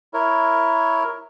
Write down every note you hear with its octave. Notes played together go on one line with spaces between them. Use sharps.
E4 A#4 C#5